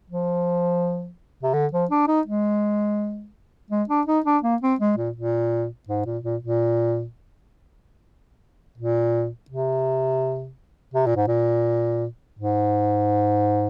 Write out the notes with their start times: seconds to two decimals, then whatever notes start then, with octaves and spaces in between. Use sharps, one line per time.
0.10 F3
1.43 C3
1.54 D3
1.73 F3
1.91 D4
2.08 D#4
2.27 G#3
3.70 G#3
3.89 D4
4.07 D#4
4.25 D4
4.43 A#3
4.62 C4
4.80 G#3
4.97 A#2
5.16 A#2
5.88 G#2
6.06 A#2
6.24 A#2
6.42 A#2
8.77 A#2
9.50 C3
10.94 C3
11.06 A#2
11.16 G#2
11.28 A#2
12.39 G#2